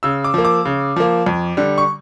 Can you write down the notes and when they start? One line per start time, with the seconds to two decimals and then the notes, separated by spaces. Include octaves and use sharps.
0.03 C#3 E6
0.24 D6
0.34 F3 A#3
0.45 D6
0.65 C#3
0.96 F3 A#3
1.26 F2
1.57 D3 G3
1.78 C#6